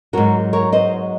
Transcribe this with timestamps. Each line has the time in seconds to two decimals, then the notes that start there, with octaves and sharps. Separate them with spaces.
0.13 G#2 F#3 F#4 A#4
0.53 A#4 C#5
0.73 C5 D#5